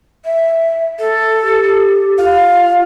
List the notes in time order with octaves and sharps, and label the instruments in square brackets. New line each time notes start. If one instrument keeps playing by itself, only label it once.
[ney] E5
A4
[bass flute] G4
[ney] F4 [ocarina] F5